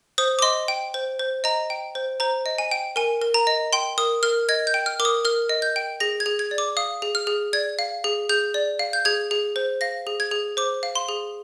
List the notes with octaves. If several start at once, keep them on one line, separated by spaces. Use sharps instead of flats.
C5 D#6
D6
D#5 C6
G5
C5
C5
D#5 A#5
G5
C5
C5 A#5
D#5
G#5
G5
A#4 G#5
A#4
A#5
D#5
G5 C6
A#4 D#6
A#4 F6
D#5 G#6
G6
G5
F6
A#4 D6
D#6
A#4 F6
D#5
G6
G5
G#4 A#6
G#6
G#4
G#6
D5
D6
F5 D#6
G#4
F6
G#4
D5 G#6
F5
G#4
G#4 G6
D5
F5
G6
G#4 G#6
G#4
C5
F5 A#6
G#4
G#6
G#4
C5 D6
F5
C6
G#4